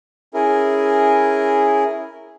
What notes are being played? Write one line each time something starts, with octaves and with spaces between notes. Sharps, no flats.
C#4 E4 G#4 A#4